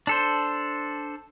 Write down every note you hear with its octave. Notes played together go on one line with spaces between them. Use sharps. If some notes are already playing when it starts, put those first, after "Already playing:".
D4 A4 C5